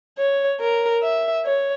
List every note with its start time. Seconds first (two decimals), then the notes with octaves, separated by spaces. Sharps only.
0.18 C#5
0.60 A#4
1.03 E5
1.45 C#5